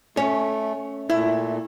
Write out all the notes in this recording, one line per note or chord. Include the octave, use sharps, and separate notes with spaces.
A3 C#4 C#5
A#2 A3 E4